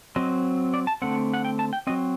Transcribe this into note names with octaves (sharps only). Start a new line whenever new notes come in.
F#3 C4 D#5
D5
A5
D3 A3 C4 F#5
F#5
G5
A5
G5
F#3 C4 D#5